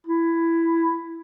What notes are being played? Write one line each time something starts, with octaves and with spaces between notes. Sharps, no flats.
E4